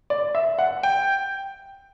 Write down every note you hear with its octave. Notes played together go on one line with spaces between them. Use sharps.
D5
E5
F#5
G5